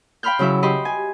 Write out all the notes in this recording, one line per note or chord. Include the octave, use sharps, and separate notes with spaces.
F5 G5 B5 C6 F6 G6
C#3 F#3 E4 E5
G4 D#5 B5 C6
G#5